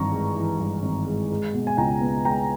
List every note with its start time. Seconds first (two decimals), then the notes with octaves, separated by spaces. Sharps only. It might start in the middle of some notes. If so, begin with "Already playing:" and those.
Already playing: G#1 G2 E3 A#5 C#6
0.12 G#3
0.36 E3
0.60 G2
0.83 G#1
1.06 G#3
1.30 G#3
1.54 B2
1.67 G#5
1.77 C#2 G5 A#5
2.01 B3
2.25 G#3 G5 A#5